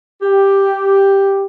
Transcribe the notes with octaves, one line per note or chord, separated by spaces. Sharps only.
G4